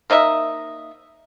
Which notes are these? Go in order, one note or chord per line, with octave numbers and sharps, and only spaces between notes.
A#3 D#4 D#5 E5